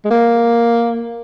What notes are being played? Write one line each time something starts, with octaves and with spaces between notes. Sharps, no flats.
G#3
A#3